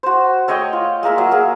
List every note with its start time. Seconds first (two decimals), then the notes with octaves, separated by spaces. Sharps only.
0.03 F#4 C5
0.48 A3 C#5 D#5 G5
0.73 F4
1.03 G#3 A#3 A#4 E5
1.18 F#3
1.31 A#3 G#4